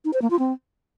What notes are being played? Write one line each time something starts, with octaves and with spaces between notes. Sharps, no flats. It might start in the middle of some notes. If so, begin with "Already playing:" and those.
D#4
C5
A#3
F4
C4